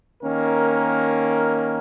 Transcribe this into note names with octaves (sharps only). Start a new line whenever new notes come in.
D#3 A#3 C#4 A#4